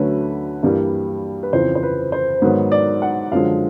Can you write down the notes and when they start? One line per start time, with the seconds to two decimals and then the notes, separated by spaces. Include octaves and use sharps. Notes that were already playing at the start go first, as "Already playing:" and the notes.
Already playing: D2 D3 F#3 A3 C#4 B4
0.63 G2 E3 G3 A#3
1.43 B4
1.53 F2 C#3 E3 C5
1.75 C5
1.83 B4
2.12 C5
2.42 G#2 D#3 F#3 B3
2.72 D5
3.02 F#5
3.32 F#2 D3 F3 G#3 F5